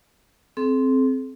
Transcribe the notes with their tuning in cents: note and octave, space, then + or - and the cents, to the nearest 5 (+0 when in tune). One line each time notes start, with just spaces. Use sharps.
C4 +0 A4 -45